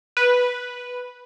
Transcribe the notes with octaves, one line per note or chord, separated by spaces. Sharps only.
B4